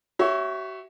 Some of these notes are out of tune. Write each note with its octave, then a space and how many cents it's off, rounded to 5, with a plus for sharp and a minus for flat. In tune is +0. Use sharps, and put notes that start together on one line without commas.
F#4 +45 C#5 +0 E5 +0